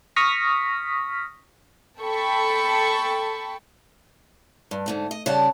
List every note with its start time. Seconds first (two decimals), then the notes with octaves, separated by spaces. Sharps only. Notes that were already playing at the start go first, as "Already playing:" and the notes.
0.16 C#6 D#6 F6 A#6 B6
2.00 A4 G5 A5 B5 C#6
4.71 G2
4.86 G#2 D3 A3
5.11 D#5
5.26 C#3 G3 D5 F#5 A5